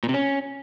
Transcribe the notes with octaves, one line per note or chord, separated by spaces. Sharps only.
A#2
C3
C#4